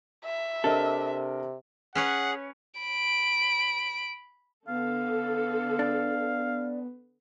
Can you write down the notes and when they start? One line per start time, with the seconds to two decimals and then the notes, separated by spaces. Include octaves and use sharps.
0.25 E5
0.64 C3 D4 A4 A#4 D#5
1.95 C#4 G#4 B4 C#5 F#5
2.80 B5 D7
4.68 D3 B3 A4 F5
5.79 D4